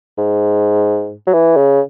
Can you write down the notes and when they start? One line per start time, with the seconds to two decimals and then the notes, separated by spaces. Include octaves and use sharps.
0.18 G#2
1.27 F#3
1.33 E3
1.57 C#3